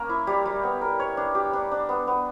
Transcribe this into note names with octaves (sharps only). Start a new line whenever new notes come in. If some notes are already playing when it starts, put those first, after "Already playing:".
Already playing: A#3 C#4 A#4
E4
G3
G3
B3
A#4
C#5
D4
G4
D4
D4
B3
B3